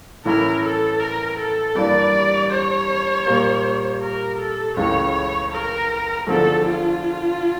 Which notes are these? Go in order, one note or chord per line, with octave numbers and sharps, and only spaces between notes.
A2 E3 A3 C#4 E4 A#4
A4
A#4
A4
G2 E3 G3 A#3 D5
C#5
A#2 G3 A#3
A#4
A4
C#2 C#3 E3 A3 C#5
A#4
E2 D3 F3 A3 A4
F4